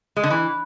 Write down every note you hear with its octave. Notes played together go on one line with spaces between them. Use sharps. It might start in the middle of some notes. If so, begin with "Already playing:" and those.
G#3
D3
E3